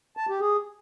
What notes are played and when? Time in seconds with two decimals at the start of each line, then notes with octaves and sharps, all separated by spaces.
0.17 A5
0.29 G4
0.40 G#4